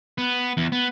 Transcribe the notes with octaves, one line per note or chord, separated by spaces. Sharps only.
B3
E2
B3